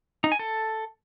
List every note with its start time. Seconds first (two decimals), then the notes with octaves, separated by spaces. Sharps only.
0.24 D#4
0.32 G#5
0.39 A4